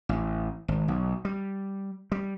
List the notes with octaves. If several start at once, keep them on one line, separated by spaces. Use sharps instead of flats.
A1
G#1
B1
G3
G3